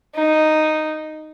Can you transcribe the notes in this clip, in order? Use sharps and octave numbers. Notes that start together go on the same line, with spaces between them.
D#4